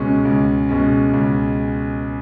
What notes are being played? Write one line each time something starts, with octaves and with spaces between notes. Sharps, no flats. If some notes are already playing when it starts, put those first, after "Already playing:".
Already playing: C#2 B2 G#3 C#4
C#2
B2 G#3 C#4
C#2